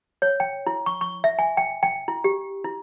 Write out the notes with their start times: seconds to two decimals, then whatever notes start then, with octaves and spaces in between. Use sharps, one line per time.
0.22 C#5
0.40 G5
0.67 E4
0.86 C#6
1.01 C#6
1.24 E5
1.39 G#5
1.57 G5
1.83 G5
2.08 E4
2.24 G4
2.64 E4